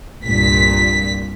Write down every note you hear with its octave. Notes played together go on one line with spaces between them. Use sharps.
C2 G2 A#2 B6